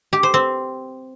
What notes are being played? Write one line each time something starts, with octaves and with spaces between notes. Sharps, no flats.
G4
C5
C4